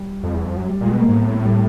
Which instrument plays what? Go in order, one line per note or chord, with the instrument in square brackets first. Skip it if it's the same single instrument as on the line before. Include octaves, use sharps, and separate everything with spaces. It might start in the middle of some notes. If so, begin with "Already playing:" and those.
Already playing: [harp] G3
[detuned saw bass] F2
E2
F2
F#2
[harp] G3
[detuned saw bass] A#2 [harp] G#3
[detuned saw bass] B2
[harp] A#3
[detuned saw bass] G#2
[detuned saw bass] A2 [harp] B3
[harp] C4
G3